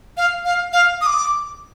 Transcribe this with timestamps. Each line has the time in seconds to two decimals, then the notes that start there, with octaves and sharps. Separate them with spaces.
0.17 F5
0.45 F5
0.73 F5
1.01 D#6
1.06 D6